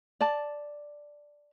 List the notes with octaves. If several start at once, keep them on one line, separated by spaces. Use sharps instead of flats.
D5 A5